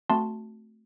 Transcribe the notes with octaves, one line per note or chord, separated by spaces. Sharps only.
A3 C4 F#4 A5 C6